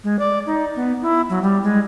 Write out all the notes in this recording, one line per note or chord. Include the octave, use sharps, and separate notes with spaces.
G#3
D5
D#4
B3
E4
F#3
G3
G#3